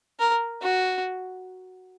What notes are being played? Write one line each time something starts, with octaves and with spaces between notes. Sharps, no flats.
A#4
F#4